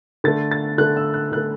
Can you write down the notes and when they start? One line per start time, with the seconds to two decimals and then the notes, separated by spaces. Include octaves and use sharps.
0.24 D3 A3 A6
0.51 A6
0.78 D3 A3 F#6
0.97 E6
1.14 F#6
1.32 D3 F#6
1.37 A3